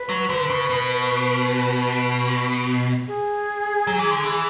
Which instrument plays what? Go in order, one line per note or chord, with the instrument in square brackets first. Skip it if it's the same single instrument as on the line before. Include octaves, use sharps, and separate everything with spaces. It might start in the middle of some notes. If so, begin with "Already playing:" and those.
Already playing: [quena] B4
[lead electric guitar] F#3
D3
C#3
B2
[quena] G#4
[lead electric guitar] F#3
E3
D3
E3